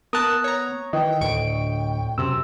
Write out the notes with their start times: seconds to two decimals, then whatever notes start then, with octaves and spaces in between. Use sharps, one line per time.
0.13 B3 A#4 A5 D#6 F#6
0.44 C#5 A#5
0.93 D#3 E3 D#5 G5
1.21 D2 A2 G5 C#6 D7
2.18 F#2 C3 E6